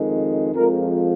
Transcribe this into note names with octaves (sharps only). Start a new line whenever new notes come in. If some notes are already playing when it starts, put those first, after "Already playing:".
Already playing: F2 D#3 G#3
F2 F3 G#3 A#4